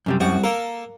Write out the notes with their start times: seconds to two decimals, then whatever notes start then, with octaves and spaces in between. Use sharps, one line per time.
0.06 F#2 C3 G3
0.20 C2 F#2 G3 F#4
0.44 A#3 A4 A#4